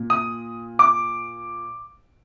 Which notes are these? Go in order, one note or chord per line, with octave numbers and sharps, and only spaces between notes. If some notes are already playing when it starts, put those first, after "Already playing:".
Already playing: A#2
D#6
D6